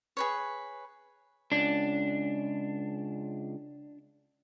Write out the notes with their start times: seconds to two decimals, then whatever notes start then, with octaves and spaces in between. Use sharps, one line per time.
0.17 G#4 B4 C#5
1.52 C#2 D4